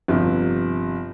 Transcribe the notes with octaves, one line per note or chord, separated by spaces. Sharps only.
G1 C3 F3